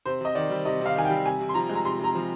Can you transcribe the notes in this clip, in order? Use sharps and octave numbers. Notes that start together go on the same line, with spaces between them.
C3 C5
C3 D#5
D#3 D5
G3
C3 D#5
C3 F5
D#3 G#5
G3 G5
C3 G#5
C3
C6
F3 A#5
G#3
A#5
C3 C6
C3
A#5
F3